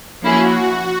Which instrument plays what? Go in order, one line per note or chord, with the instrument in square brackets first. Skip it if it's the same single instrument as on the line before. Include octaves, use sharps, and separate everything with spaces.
[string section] F3 A#3 C#4 E4 G#4 [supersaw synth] F#4